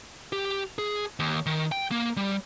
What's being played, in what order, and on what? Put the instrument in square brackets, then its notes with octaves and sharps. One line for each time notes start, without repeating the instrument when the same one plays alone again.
[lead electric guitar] G4
G#4
D#2
D#3
G5
A#3
G3